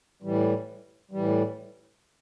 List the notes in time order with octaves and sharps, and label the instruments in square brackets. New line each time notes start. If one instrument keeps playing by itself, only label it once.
[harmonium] A2 E3 G3
A2 E3 G3